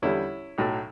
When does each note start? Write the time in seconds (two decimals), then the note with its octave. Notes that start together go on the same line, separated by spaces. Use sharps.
0.02 E2 D3 G3 C#4 E4
0.58 B1 A2 F#3 A3